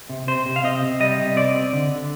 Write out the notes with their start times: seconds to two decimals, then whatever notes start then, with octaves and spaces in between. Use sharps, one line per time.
0.09 C3
0.27 C3 C5
0.46 C3
0.56 F5
0.64 C4 D#5
0.82 C3
1.00 G3 D#5
1.18 C3
1.36 C4 D5
1.55 C4
1.73 D3
1.91 D3